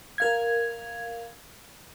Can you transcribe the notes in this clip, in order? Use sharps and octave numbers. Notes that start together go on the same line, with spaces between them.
A#4 F5 G#6